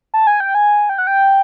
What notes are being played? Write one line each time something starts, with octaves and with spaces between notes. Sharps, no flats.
A5
G#5
G5
G#5
G5
F#5
G5